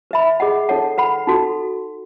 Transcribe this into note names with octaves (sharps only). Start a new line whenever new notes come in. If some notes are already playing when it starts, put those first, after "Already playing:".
B4 E5 B5
G#4 D#5 F#5
D#4 A4 C#5 F#5
B4 F#5 B5
D#4 F#4 A4